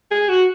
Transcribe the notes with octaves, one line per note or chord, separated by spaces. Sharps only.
G#4
F#4